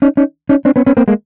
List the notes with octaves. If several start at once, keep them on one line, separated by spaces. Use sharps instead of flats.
C#4 D#4
C#4 D#4
C#4 D#4
C4 D4
B3 C#4
B3 C#4
A#3 C4
G#3 A#3